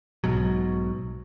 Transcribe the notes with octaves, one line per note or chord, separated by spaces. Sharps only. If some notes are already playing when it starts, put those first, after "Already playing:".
B1 G#2 B2 F#3